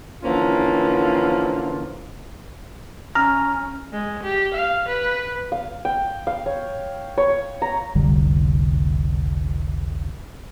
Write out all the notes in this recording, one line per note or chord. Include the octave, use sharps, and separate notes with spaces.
D3 E3 F3 A#3 C#4 F4
C#4 A#5 F6
G#3
G4
F5
B4
F5
G5
F5
C#5
C#5
A#5
F1 C2 D3 G3